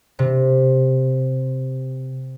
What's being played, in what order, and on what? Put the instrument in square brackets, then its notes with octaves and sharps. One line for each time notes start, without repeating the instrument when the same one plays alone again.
[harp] C3